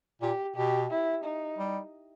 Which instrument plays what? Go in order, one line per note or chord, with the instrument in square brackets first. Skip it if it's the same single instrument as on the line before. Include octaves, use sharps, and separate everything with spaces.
[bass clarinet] A#2 [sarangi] G4
[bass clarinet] B2 [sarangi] G4
[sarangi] E4
D#4
[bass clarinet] G3